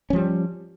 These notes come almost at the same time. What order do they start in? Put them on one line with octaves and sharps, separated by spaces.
C#4 F3 G3